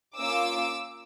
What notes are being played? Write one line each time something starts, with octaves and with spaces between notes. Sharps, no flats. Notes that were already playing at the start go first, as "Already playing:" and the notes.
A#3 C#4 F4 D6 E6